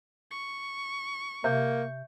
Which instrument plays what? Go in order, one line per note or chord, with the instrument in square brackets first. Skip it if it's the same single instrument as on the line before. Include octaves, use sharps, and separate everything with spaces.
[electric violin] C#6
[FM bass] C3 [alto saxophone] A#3 [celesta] E5 G6